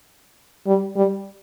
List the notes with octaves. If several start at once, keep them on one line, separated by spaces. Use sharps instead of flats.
G3
G3